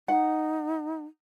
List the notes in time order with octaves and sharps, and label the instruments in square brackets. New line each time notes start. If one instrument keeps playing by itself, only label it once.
[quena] D#4 [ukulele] F#5